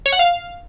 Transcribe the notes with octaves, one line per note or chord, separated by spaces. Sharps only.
C#5
F#5
F5